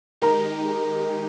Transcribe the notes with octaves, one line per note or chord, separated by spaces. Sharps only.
D#3 G#3 D#4 G4 A#4 A#5